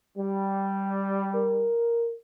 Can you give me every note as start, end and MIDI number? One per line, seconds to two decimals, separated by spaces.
0.17 1.72 55
1.34 2.14 70